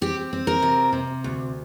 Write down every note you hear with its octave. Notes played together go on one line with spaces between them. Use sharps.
C4 G4
C4
A#4
C3
C3
D2